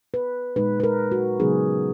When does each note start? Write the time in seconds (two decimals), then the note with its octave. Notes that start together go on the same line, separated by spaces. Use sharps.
0.14 B4
0.56 A#2 G#3 D#4 B4
0.80 B4
0.83 A#4
1.12 F#4
1.40 C#3 F#3 B3 D#4 G#4